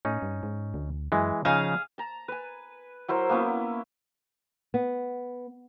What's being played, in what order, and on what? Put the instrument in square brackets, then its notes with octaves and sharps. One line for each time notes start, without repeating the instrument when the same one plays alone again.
[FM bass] A2 [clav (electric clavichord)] C#4 D#4
[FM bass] G2
G#2
D2
[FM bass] F#2 [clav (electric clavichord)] E3 G#3
[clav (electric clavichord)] C#3 D#4 [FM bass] F3 [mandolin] G#4 F5
[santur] A5 A#5
B4 G#5
F#3 E4 A#4 C5
A#3 B3 C#4 E4
[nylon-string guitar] B3